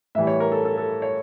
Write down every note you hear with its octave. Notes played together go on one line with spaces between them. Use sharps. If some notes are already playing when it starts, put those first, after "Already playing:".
A2 E3 G3 E5
C#5
A#4
A4
A4
A4
C#5